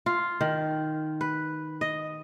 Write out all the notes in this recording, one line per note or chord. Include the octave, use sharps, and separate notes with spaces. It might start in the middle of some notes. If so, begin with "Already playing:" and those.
F4
D#3
B4
D#5